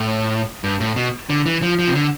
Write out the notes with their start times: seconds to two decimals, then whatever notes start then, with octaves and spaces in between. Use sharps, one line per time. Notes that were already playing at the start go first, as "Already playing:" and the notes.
Already playing: A2
0.64 G2
0.80 A2
0.96 B2
1.30 D3
1.46 E3
1.62 F3
1.79 F3
1.88 C3
1.95 D3